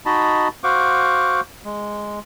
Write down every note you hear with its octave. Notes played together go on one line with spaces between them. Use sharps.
D#4 F#4 D#5 A5 B5
F#4 C5 F5 F#5 C#6 D6
G#3